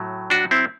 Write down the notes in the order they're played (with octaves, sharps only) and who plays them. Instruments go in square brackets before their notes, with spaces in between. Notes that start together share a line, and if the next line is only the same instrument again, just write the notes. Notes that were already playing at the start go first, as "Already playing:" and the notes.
Already playing: [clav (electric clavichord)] A2 F#3 A3
D4 F#4
C4 E4